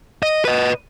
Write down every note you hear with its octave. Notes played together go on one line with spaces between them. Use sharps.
D#5
B4 D#5